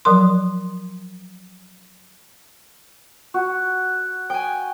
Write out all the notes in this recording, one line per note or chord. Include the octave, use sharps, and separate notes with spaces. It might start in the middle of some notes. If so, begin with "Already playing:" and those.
F3 F#3 A#4 C6
F#4
G5 G#5 D#6